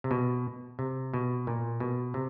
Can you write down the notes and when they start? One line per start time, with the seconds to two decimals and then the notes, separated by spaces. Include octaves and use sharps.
0.04 C3
0.11 B2
0.79 C3
1.14 B2
1.47 A#2
1.80 B2
2.14 C3